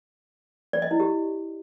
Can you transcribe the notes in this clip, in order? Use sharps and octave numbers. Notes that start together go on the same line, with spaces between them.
D5
D#5
E4
G4